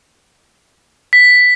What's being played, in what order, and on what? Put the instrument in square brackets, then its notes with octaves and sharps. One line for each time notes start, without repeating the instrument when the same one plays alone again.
[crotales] B6